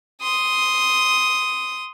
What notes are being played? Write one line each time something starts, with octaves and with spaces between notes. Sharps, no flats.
C6 D#6